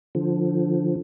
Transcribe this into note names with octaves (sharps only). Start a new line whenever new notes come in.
D3 F3